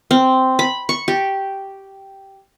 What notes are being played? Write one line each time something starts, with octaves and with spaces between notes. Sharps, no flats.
C4
B5
C#6
G4